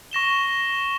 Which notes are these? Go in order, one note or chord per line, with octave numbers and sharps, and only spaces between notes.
C#6 A#6 E7 G7